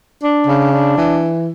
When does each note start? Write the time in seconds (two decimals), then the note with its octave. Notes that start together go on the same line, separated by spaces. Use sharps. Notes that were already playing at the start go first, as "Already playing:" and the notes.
0.21 D4
0.45 C#3
0.71 D4
0.97 E3